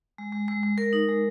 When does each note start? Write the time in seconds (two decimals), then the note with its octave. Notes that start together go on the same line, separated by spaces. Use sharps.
0.18 G#3
0.32 G#3
0.48 G#3
0.63 G#3
0.78 G#3 A#4
0.93 D#4
1.08 G#3